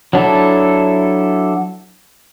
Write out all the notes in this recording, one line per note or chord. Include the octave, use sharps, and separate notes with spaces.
F#3 D4 E4 A4